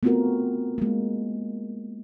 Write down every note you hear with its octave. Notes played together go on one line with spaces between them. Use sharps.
A3 B3 C4 F4 F#4 A#4
G#3 A#3